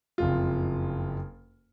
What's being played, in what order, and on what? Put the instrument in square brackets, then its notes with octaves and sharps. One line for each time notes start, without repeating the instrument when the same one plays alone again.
[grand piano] F#1 F2 F4